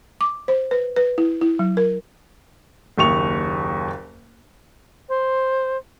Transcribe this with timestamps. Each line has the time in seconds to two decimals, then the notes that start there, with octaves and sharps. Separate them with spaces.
0.21 D6
0.48 C5
0.71 B4
0.96 B4
1.18 E4
1.41 E4
1.59 F#3
1.77 A#4
2.98 F#1 D#2 C#6 F7
5.09 C5